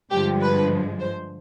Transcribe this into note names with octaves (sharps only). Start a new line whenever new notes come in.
G2 D3 F3 G#3 G4
B4
C5